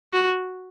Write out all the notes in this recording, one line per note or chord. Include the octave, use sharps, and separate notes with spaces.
F#4